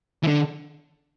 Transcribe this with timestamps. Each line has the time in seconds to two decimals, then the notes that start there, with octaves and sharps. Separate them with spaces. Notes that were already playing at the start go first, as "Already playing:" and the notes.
0.23 E3
0.27 D3